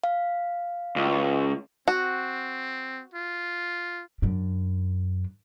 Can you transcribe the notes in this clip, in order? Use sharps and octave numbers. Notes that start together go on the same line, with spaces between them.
F5
C#2
C4 F#4
F4
F#2 D4